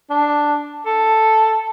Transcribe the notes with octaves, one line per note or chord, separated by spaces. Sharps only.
D4
A4